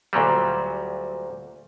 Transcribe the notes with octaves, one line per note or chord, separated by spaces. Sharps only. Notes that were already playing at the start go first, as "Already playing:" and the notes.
D2 A#2 F#3 G3